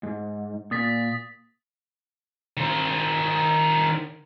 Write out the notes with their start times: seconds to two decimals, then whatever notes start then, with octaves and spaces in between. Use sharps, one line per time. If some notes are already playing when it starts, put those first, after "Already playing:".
0.03 G#2
0.71 A#2 D#6 A6 B6
2.57 D#3 C5